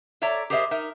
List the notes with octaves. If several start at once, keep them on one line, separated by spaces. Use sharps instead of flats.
A4 C#5 D5 E5 A#5
G4 G#4 A#4 C5 D#5 E5
D#4 A#4 E5